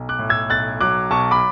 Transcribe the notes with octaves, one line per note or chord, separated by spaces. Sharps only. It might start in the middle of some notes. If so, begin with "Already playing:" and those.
Already playing: B1
D6 F#6
A2
E6 G#6
B1 F#6 A6
F#3 D6 F#6
B1 A5 C#6
B5 D6